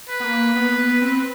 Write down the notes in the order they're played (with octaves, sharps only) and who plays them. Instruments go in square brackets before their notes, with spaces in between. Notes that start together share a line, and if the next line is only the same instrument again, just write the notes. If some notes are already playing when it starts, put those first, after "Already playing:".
[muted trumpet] B4
[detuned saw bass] B3
A#3
B3
B3
C4